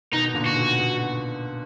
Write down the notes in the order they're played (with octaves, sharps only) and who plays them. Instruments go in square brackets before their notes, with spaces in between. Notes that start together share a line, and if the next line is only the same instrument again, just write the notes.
[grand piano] B2 D#3 [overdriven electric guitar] D#4
[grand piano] A#2 D3
[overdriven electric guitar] F#4
[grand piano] B2
B2